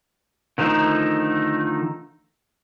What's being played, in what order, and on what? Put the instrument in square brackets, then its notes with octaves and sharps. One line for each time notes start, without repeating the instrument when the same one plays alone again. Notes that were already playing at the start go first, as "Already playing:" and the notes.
[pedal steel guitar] D3 D#3 F3 A3 D#4